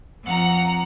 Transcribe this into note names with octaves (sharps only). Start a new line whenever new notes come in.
F2 F#5 A#5